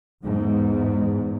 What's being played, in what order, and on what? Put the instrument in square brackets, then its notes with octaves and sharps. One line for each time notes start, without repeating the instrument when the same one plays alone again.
[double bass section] E2 G#2